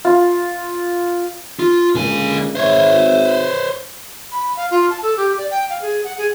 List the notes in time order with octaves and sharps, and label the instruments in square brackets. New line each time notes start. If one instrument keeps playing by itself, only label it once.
[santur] F4
[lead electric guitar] F4
[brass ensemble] C#2 A#2 A#3 [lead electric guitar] D3 G#5
[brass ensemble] G#1 G#4 E5 [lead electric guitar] C5 C#5
[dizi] B5
F5
F4
A5
A4
G4
D5
G5
F5
G#4
F#5
G#4